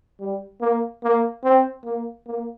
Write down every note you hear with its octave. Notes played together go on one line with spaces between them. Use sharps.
G3
A#3
A#3
C4
A#3
A#3